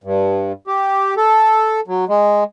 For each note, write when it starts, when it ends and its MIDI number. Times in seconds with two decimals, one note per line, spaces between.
0.04 0.52 43
0.67 1.14 67
1.17 1.80 69
1.87 2.05 54
2.09 2.44 56